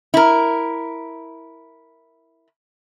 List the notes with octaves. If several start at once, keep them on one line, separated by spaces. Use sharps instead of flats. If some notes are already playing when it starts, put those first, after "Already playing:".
E4 A#4